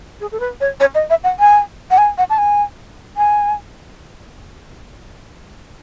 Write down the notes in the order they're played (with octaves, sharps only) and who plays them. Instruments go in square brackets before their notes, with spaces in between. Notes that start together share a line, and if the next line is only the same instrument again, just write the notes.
[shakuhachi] G#4
A4
B4
C#5
C#5
D#5
E5
F#5
G#5
F#5
G#5
F#5
A5
G#5
G#5